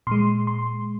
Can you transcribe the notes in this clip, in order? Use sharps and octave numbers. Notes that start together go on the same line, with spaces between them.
A#2 G#3 C6
C6